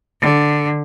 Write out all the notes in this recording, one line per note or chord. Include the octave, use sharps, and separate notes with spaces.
D3